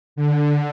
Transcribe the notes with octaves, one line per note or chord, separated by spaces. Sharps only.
D3